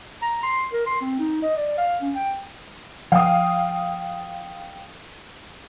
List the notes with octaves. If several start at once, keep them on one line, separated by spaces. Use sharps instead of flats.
A#5
C6
A#4
C6
C4
D#4
D#5
D5
F5
C#4
G5
F3 F5 G5 D#6